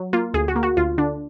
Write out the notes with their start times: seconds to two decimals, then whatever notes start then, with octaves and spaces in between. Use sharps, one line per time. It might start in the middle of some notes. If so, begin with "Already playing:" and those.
Already playing: F#3
0.13 A#3 F4
0.34 D2 G#4
0.48 F#4
0.56 A#3
0.63 F#4
0.77 D2 F4
0.98 D3 D4